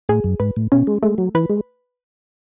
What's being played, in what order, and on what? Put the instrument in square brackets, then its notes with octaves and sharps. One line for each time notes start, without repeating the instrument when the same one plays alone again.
[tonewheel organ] A2 [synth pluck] G#4
[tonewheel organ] F#2
[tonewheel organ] G#2 [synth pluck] B4
[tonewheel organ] A2
[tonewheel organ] B2 [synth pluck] C#4
[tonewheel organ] G#3
[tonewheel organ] G#3 [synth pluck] A3
[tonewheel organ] F#3
[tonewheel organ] E3 [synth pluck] B4
[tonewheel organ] G#3